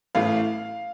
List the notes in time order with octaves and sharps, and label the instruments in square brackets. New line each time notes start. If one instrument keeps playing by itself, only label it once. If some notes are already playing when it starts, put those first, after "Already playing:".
[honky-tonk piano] A1 A2 A3 F5